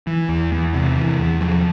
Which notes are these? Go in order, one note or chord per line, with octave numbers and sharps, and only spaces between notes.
E3
E2
E2
C3
E3
E2
F3